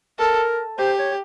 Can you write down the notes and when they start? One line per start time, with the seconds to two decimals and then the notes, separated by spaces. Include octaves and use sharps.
0.19 A4 A#4
0.78 G4 C5
0.99 C#5